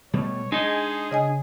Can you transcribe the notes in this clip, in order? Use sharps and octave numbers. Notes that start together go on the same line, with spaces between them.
B2 G3 A3 C#5
G#3 D4 D#4 G#4
C#3 D#5 G#5